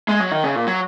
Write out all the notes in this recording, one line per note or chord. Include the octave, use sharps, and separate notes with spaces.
G#3
F#3
D#3
C#3
A#2
F#3